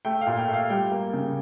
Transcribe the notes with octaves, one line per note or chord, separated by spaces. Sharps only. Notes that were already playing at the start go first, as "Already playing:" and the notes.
A3 G5
F5
A#2
G5
A3 F5
G3 G5
A#3
C#3